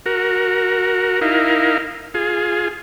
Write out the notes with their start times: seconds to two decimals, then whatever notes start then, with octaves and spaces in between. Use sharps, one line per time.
0.06 F#4 A#4
1.21 D#4 E4 A#4 F5
2.14 F4 G#4